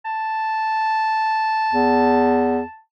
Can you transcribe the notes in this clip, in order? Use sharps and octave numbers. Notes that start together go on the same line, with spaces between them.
A5
E2